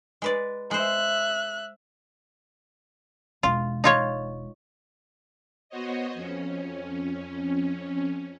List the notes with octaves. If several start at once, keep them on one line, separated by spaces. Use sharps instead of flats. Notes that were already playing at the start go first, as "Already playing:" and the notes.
G#3 B4 D5
G#3 C5 E5 F#6
E1 G#3 F4
D#4 F4 C#5
B3 F#4 C5 C#5 D#5
F2 C#4